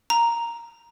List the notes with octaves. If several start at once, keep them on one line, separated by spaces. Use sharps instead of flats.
A#5